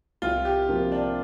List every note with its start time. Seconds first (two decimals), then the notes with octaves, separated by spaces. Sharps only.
0.22 C2 F4
0.45 G4
0.69 C3 F3 A#3
0.92 D4